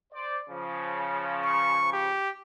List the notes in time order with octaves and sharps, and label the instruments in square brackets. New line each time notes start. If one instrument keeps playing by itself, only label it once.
[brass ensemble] C5 D5
C#3 F3
[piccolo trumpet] C#6
G4